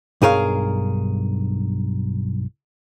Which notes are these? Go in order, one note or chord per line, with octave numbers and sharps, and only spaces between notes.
B1 G2 G#4 A#4 C#5 F5